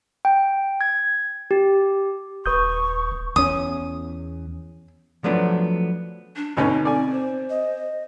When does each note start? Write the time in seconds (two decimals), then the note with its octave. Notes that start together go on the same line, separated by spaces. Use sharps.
0.25 G5
0.81 G#6
1.51 G4
2.46 D#1 B4 C#6 D#6 G6
3.36 E2 C#4 D#6
5.24 F3 F#3 A3 B3 D4
6.36 D4
6.57 D2 B2 C4 C#4 D#4
6.85 C4 D5 G#5
7.12 C5
7.50 D#5